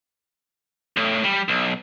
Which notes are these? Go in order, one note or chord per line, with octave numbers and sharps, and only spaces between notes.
A2
G3
B1